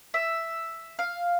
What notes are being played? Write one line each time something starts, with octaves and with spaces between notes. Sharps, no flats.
E5
F5